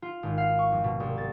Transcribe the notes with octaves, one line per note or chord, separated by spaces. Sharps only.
F4
G#1
F5
C#6
F2
B2
C2
A6